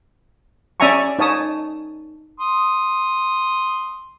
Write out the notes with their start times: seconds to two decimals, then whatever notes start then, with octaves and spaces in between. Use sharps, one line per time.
0.80 C#4 D5 E5 G#5 A#5 C#6
1.19 D#4 C#5 A5 D#6
2.40 C6 D#6